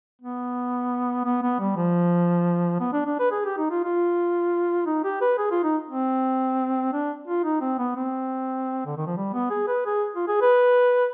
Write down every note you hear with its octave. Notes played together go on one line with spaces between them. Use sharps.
B3
B3
B3
G3
F3
B3
D4
D4
B4
G#4
G4
D#4
F4
F4
D#4
G4
B4
G#4
F4
D#4
C4
D4
F4
D#4
C4
B3
C4
D3
D#3
F3
G3
B3
G#4
B4
G#4
F4
G#4
B4